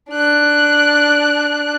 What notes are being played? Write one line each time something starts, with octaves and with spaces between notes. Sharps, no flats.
D4 F#6